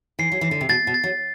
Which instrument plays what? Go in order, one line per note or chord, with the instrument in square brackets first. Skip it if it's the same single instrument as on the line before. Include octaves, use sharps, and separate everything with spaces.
[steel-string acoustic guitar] E3 [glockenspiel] C7
[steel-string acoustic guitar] F#3
[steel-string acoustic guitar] E3 [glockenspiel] C7
[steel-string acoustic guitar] D3
C3
[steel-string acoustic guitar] B2 [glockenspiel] A6
[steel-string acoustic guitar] B2
[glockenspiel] A6
[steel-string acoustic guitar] F#3